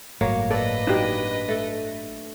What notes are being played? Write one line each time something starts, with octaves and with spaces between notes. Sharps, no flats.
G1 A2 F#3 A#3 C#5
A4 B4 D5 D#5
F#3 D4 D#4 G4
A3 A4